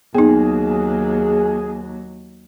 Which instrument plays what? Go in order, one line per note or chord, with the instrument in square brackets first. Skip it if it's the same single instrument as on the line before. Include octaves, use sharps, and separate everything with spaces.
[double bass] D#2 F#3 [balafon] B3 D#4 [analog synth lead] G#4